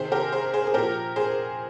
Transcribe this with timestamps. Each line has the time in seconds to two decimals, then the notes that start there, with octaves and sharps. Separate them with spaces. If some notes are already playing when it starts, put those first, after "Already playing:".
Already playing: C3 D#3 G#4 C5
0.12 G4 A#4
0.32 G#4 C5
0.54 G#4 C5
0.67 G#4
0.74 A#2 F3 G4 A#4
1.16 G#4 C5